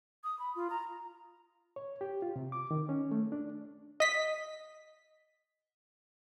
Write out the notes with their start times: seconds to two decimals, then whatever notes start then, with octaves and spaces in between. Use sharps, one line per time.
0.24 D#6
0.39 B5
0.56 F4
0.70 A#5
1.76 C#5
2.01 G4
2.22 F4
2.36 C3
2.52 D6
2.71 D#3
2.89 C#4
3.11 A3
3.32 D4
4.00 D#5 B6